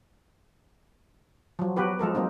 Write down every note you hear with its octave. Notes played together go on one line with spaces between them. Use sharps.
F3 F#3
F#3 B3 F#4 G4 B4
F3 G#3 A4 A#4
F#3 A#3 C4 D#4